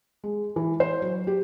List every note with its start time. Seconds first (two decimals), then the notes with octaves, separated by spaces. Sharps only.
0.24 G#3
0.56 E3
0.80 C5
1.02 F#3
1.27 G4